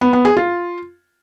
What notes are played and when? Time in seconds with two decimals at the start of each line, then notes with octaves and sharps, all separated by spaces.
0.01 B3
0.13 B3
0.25 G#4
0.37 F4